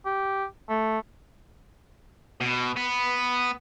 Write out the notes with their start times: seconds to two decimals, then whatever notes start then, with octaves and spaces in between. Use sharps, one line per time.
0.05 G4
0.69 A3
2.41 B2
2.76 B3